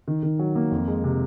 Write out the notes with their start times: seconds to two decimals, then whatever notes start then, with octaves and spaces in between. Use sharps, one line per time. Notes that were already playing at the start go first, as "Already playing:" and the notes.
0.08 D#3
0.23 D#3
0.39 F#3
0.55 A#3
0.71 F2
0.88 G#3
1.04 C3